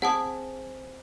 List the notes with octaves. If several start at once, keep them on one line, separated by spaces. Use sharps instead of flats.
C4 G#4 F#5 A5 D#6